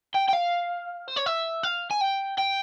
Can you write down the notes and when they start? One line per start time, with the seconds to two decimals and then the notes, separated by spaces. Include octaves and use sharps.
0.15 G5
0.29 G5
0.33 F5
1.08 C5
1.17 C#5
1.26 E5
1.63 F5
1.91 G#5
2.01 G5
2.38 G5